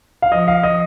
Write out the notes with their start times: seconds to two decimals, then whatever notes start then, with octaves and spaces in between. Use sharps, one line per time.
0.22 F5
0.32 F3 D#5
0.48 F5
0.63 D#5